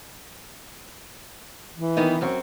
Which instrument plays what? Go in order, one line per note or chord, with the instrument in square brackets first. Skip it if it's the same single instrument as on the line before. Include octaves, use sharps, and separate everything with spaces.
[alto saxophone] E3
[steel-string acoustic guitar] D#3 B3 D#4
F#2 C4 F#4